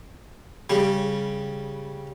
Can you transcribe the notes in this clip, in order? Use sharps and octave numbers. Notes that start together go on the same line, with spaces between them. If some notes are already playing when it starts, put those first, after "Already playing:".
C#3 G3